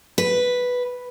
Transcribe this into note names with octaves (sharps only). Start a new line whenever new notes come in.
B4